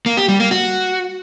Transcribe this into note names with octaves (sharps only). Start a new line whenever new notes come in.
A#3
G4
G3
A#3
F#4